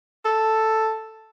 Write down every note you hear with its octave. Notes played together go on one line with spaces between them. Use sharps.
A4